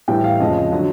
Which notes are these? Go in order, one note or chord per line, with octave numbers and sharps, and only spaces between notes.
A2 E3 G3 G5
F5
F2 C#3 F3 G#3 D#5
D3 F#3